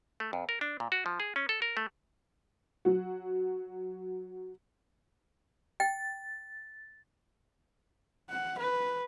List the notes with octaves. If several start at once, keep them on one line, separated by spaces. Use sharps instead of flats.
A3
F2
A#4
D4
A#2
F#4
F3
G#4
C#4
A4
A#4
A3
F#3 F#4
G5 A6
F#5
B4